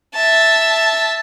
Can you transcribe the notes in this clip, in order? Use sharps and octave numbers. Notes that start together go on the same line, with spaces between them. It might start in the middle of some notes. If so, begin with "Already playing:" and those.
E5 A5